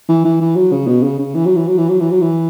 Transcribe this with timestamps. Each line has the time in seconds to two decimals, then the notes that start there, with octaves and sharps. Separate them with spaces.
0.09 E3
0.25 E3
0.41 E3
0.55 F#3
0.72 C#3
0.87 B2
1.03 C#3
1.19 C#3
1.35 E3
1.46 F#3
1.56 E3
1.68 F#3
1.78 E3
1.89 F#3
2.00 E3
2.11 F#3
2.22 E3